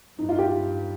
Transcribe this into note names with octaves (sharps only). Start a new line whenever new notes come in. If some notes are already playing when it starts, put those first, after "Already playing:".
G2 D#4
F4
G4
F4